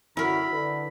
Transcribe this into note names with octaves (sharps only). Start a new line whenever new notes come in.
F#2 D3 E4 F#4 A#4 B5
D3 B4